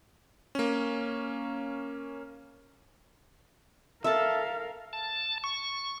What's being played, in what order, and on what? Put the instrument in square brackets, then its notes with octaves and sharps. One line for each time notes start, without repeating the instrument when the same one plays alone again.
[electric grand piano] A#3 C#4
[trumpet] A4 [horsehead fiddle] A#4 F5 [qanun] E5 A5
[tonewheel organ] A5
C#6